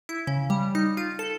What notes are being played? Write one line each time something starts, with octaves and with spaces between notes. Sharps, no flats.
E4
C#3
G3
D#4
F4
A4